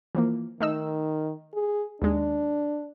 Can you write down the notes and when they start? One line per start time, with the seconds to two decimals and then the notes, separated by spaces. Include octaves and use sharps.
0.15 E3 F3 A#3
0.60 D#3 A3 D#4 E6
1.53 G#4
2.02 D#2 G#3 D4